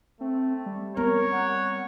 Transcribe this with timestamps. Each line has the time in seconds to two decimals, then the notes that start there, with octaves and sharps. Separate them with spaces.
0.21 A3 C4
0.66 G3
0.97 B3 C4 A#4 C#5
1.33 F#5